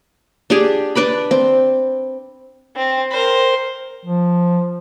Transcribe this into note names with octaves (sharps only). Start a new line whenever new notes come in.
D4 G4 G#4
D4 B4 D5 B5
C4
C4
A#4 C5
F3